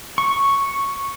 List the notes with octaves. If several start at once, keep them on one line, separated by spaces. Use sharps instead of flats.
C#6